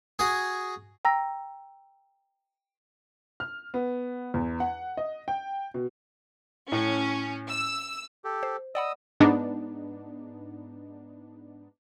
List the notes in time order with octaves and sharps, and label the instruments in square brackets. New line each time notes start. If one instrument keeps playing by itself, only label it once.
[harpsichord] F#4 G#4
[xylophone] G5 A#5 E6 A#6
[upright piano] F6
B3
E2
F#5
D#5
G5
B2
[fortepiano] A2 [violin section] C#4
[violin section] E6
[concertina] G4 A4
[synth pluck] C5
[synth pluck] D5 F#5 B5 [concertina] D#5 D#6 E6
[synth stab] G#2 B3 D4 D#4